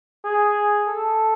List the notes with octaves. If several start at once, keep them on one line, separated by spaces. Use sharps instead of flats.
G#4
A4